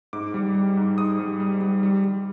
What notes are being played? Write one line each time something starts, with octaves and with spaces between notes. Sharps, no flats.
G#2 D6
G3
G3
G#2
G#2 D#6
G3
G3
G3
G3
G3